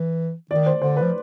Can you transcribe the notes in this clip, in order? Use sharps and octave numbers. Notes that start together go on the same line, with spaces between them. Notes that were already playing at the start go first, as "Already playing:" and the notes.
Already playing: E3
D#3 D5
C5
D3 C5
B4
F3